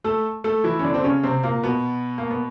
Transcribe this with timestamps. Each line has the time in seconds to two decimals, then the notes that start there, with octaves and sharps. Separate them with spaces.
0.04 A3 A4
0.44 A3 A4
0.64 E3 E4
0.79 C#4
0.84 D3 D4
0.94 C4
1.04 C#3 C#4
1.23 C3 C4
1.43 A#2 A#3
1.63 B2 B3
2.18 A#3
2.31 B3